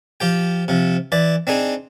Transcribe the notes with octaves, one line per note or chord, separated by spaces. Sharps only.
F3 G4 G5
C3 F3
E3 D5
C4 D4 D#4 G#4